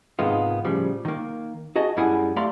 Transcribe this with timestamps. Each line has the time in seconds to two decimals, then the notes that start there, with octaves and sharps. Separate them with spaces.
0.19 G#2 C3 D#3 G#3 B3 F4
0.65 A2 C#3 F3 G3
1.05 D#3 A#3
1.76 F#4 G#4 D#5 A5
1.97 F#2 G3 E4 G#4 F#5 G#5
2.36 A3 G4 D5 F5 A#5 C6